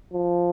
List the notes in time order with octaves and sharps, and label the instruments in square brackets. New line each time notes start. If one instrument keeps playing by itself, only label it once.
[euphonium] F3